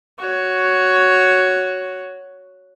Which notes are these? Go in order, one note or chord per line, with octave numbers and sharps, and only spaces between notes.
F#4 C#5